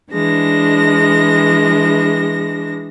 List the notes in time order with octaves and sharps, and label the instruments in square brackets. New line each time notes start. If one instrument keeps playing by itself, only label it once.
[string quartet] E3 G#3 D4 A#6